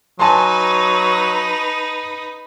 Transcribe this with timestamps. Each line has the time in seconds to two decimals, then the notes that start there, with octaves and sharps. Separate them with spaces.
0.20 F#3 D#4 B4 G#5 A5 C6